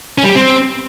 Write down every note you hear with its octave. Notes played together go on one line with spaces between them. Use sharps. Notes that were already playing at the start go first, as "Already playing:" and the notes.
C#4
G3
G4
C4